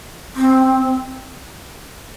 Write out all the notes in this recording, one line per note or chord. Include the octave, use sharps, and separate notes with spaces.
C4